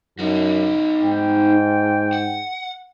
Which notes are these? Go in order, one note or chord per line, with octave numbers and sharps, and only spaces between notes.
F#2 D#4 F#4
G#2 G5
F#5